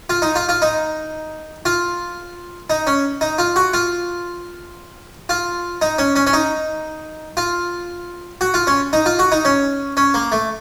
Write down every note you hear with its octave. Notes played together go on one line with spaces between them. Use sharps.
F4
D#4
F4
F4
D#4
F4
D#4
C#4
D#4
F4
F#4
F4
F4
D#4
C#4
C#4
C#4
D#4
F4
F#4
F4
C#4
D#4
F4
F#4
D#4
C#4
C#4
A#3
A3